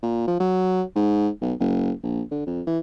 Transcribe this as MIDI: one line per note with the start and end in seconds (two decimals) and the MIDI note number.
0.03 0.27 46
0.27 0.38 53
0.40 0.82 54
0.96 1.28 44
1.42 1.53 35
1.60 1.91 30
2.03 2.22 34
2.31 2.44 50
2.47 2.62 41
2.67 2.79 52